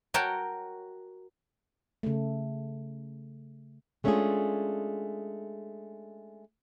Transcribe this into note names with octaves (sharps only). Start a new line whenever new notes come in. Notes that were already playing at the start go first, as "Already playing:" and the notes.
F#4 A#4 C#5 G5 A5
C#3 A3
G#3 A3 C#4 D4 F4 G#4